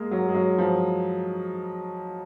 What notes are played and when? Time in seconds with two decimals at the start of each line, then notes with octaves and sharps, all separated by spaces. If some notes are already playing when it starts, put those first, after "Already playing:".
Already playing: G#3 A#3
0.11 F#3
0.28 G#3
0.35 F#3
0.58 F3